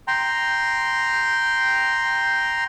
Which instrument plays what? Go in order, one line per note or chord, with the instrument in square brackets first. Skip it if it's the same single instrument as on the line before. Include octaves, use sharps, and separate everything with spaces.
[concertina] G5 A#5 C6